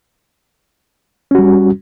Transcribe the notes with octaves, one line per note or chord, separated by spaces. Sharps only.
G3 C#4 F#4